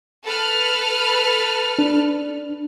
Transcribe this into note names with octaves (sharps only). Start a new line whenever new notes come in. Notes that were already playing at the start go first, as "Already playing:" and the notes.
A4 B4 F6
D4